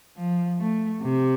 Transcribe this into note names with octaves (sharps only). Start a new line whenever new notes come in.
F3
A3
C3